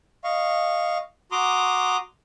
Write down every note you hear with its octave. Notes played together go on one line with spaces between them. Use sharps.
D#5 F5 C#6
F#4 A#5 C6 D6 D#6